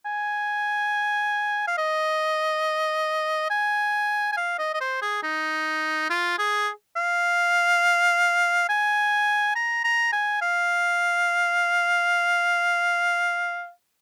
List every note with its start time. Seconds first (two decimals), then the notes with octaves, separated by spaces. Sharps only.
0.05 G#5
1.67 F5
1.78 D#5
3.50 G#5
4.32 G#5
4.37 F5
4.59 D#5
4.74 D#5
4.81 C5
5.02 G#4
5.23 D#4
6.10 F4
6.39 G#4
6.96 F5
8.69 G#5
9.56 A#5
9.84 A#5
10.13 G#5
10.41 F5